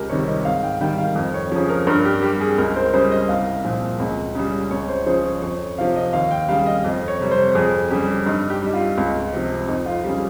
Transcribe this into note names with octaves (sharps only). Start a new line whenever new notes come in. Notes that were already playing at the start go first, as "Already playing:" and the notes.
Already playing: C#2 G4 A#4
C3 D#3 G3 C#5
D#5
G#2 F5
G5
D#3 G3 G5
F5
F2
C#5
C#3 F3
A#4
G2 A#4
G4
G3 G4
G#4
C#2 A#4
C5
C#3 G3 C5
D#5
C2 F5
A#2 F3
C#2
C#3 G3
C#2 C#5
C5
C#3 F3 C5
C#5
F2 C#5
C3 F3 F5
D#5
D#2 F5
G5
C#3 G3 F5
D#5
F2
C#5
C3 G3
C5
F2 G#4
C#3 G3 G4
G2 D#4
G4
G3 D#4
F4
C#2
C3 F3
F2 D#4
F4
C#3 G3 G4